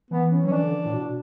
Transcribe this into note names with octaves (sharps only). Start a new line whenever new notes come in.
E3 B3
C#4
F#3 C#4
E3 D4
D3
E3
A2
B2